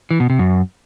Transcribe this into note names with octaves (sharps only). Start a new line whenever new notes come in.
E3
B2
C3
F#2